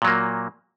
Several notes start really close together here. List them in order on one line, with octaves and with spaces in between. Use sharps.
A#2 F#3 A#3